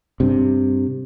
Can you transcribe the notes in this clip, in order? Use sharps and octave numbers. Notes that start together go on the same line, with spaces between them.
G2 C3